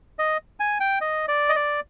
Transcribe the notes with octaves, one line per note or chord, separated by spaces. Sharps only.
D#5
G#5
G5
D#5
D5
D#5
D5